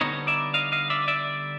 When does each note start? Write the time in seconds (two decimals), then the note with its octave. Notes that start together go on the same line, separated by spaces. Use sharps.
0.01 D3 G3 B3 D#4 C#5 D#5
0.27 D5 E5
0.54 D#5 F5
0.72 D#5 F5
0.90 D5 E5
1.08 D5 E5